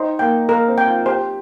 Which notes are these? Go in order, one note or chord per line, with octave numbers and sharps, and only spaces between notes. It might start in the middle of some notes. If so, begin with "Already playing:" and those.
Already playing: D#4 C5
A#3 G5
A#3 A#4
C4
G5
F4
G4 C5